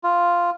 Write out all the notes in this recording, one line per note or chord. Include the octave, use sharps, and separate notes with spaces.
F4